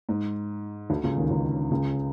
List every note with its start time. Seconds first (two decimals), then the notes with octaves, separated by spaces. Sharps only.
0.09 G#2
0.90 D2 D3
1.04 C#2 C#3
1.16 D#2 D#3
1.30 C#2 C#3
1.71 C#2 C#3